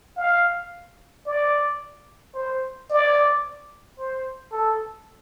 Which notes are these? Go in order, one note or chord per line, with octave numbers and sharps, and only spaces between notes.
F5
D5
C5
D5
C5
A4